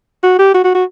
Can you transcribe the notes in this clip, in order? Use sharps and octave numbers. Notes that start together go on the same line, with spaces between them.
F#4
G4
F#4
F#4
F#4